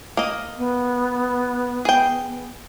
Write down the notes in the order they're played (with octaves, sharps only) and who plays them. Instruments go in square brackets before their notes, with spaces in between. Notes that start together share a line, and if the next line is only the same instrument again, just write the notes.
[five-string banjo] A#3 D#5
[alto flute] B3
[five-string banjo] G#4 G5